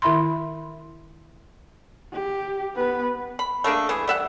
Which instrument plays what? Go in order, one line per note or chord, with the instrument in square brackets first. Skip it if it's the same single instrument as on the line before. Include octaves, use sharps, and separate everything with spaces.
[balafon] D#3 E4 E5 B5 C6
[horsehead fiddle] G4
B3 B4
[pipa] B5
A3 A#3 D4 G#4
E3 G#4
G3 E5 F#5